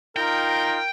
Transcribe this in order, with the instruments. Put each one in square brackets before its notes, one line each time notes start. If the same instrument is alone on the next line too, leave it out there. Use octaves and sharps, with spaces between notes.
[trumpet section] D#4 F4 A#5 [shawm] A#4 [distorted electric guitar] G5